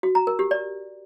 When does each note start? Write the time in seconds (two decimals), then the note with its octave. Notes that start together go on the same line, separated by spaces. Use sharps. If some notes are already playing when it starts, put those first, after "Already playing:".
0.03 F#4
0.15 A#5
0.27 A#4
0.39 G4
0.51 D5